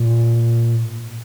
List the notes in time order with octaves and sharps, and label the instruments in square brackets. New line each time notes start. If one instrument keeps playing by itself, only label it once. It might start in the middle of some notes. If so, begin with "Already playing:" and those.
Already playing: [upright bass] A#2